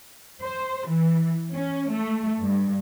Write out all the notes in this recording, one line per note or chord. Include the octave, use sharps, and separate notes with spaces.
C5
E3
C#4
A3
G2